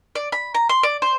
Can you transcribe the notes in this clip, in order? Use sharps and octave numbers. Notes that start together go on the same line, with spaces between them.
D5
B5
A#5
C6
D5
C5